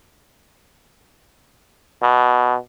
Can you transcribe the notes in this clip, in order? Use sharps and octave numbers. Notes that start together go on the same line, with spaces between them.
B2